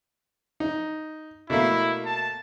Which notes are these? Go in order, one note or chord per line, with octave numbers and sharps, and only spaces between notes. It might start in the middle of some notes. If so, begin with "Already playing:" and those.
D#4
B2 A3 A#3 E4
A5